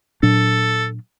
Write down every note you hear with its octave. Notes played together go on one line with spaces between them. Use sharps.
A#2 F#3 D4 A4